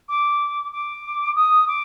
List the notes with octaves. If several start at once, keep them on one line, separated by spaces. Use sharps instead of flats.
D6
D6
D#6
D6